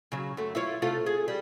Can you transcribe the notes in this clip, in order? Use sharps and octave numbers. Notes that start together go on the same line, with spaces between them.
C#3 F#3
F#2 A3
E4 F4 C#5
C3 A3 F4
G#4
G3